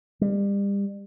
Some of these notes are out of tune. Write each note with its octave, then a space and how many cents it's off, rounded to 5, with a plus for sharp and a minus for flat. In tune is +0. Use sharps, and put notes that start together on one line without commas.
G3 +35